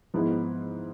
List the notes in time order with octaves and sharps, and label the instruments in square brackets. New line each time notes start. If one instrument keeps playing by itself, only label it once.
[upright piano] G#2 F3 G#3 B3 E4